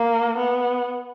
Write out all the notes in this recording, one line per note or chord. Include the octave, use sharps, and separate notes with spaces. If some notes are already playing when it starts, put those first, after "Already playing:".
Already playing: A#3
B3